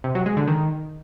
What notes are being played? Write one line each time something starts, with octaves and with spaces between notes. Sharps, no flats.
C3
F#3
G#3
D3
D#3